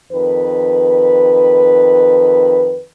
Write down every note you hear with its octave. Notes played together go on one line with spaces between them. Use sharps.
F2 D#3 B4